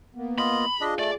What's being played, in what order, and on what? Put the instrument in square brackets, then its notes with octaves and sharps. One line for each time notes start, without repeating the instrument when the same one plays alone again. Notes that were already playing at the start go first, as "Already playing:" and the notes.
[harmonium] A#3 B3
[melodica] F4 D#5 [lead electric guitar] B5
[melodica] D4 D#5 [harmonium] F4 G#4
[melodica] A3 [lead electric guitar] D5